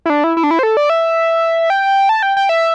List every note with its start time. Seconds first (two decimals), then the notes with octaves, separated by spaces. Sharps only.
0.06 E4
0.10 D4
0.24 E4
0.37 E4
0.44 D4
0.51 E4
0.59 C5
0.63 A4
0.77 D5
0.90 E5
1.70 G5
2.09 A5
2.23 G5
2.37 G5
2.49 E5